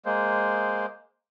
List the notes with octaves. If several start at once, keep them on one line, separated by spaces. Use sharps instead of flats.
G#3 A#3 C5